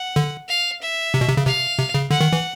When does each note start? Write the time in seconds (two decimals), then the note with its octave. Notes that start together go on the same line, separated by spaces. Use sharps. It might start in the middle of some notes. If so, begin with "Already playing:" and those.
Already playing: F#5
0.16 D3
0.49 F5
0.82 E5
1.14 C3
1.21 B2
1.29 C3
1.37 C#3
1.46 C3 F5
1.78 C3
1.94 C#3
2.11 D3 F#5
2.21 D#3
2.33 E3